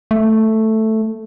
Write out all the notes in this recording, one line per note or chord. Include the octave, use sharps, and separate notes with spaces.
A3